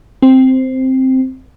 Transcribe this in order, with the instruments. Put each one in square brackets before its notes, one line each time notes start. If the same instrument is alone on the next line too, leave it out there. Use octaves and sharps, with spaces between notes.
[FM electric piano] C4